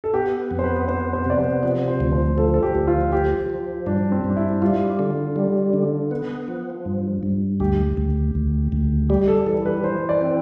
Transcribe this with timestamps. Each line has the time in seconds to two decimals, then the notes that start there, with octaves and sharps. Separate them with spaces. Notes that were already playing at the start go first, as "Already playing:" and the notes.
0.04 A4
0.13 B3 G4
0.51 F2
0.59 C5
0.64 B4
0.88 B3 C5
1.13 C5
1.26 C3 D5
1.38 C5
1.63 F3 D5
1.88 C5
2.00 D2
2.13 C5
2.38 F3 A4
2.54 A4
2.63 G4
2.75 D2
2.87 F4
3.12 F3 G4
3.50 F3
3.86 G2 D4
4.12 C4
4.24 G2
4.30 D4
4.37 E4
4.61 G3 F4
4.99 D3
5.36 G3
5.73 D3
6.11 B3
6.48 F3
6.85 G2
7.23 G2
7.60 D2 G4
7.97 D2
8.35 D2
8.72 D2
9.09 G3 G4
9.28 A4
9.47 E3 A4
9.66 B4
9.84 E3 C5
10.09 D5
10.21 C4